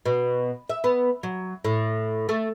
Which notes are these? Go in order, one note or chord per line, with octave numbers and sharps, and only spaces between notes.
B2
E5
B3
F#3
A2
A3